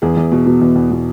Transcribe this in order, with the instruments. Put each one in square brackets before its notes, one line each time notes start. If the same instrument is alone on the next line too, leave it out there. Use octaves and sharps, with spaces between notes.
[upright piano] E2 G#4
E2
B2
B2
E2
E2
B2